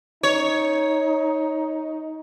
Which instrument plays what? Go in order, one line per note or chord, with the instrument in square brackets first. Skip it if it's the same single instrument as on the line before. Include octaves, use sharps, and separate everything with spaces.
[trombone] D#4 [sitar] C#5